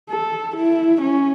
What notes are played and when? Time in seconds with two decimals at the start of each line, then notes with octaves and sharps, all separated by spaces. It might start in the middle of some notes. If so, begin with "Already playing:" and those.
0.10 A4
0.56 E4
1.01 C#4